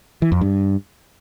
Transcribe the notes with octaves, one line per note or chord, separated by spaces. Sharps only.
E3
F2
G2